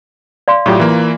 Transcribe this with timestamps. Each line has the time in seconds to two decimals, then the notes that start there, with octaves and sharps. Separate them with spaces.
0.48 D5 F5 C6
0.66 A2 F#3 F4 G4 C#6
0.80 E3 A#3